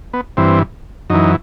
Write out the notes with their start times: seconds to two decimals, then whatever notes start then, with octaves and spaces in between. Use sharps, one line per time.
0.14 B3
0.37 G2 E3 C4
1.10 F#2 E3 D#4